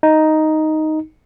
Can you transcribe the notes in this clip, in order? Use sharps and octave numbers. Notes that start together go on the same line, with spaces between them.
D#4